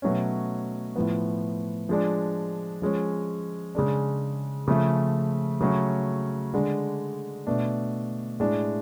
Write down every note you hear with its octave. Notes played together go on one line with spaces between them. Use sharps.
B2 F#3 A3 C#4
A2 F3 B3
F3 G#3 D4
F3 G#3 C#4
C#3 G#3 D4
C#3 F3 A3
C#3 F#3 A3 C#4
D3 G#3 D4
B2 A3 D4
A2 G#3 D4